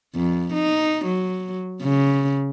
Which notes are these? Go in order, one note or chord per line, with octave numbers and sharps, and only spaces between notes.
F2
D#4
F#3
C#3